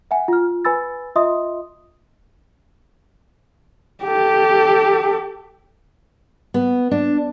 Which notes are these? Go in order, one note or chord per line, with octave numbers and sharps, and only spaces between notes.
E5 F#5 G#5
F4 F6
B4 G#5 B5 E6 A6
F4 D#5 E5 C6 D#6
G4 A4
B3
D4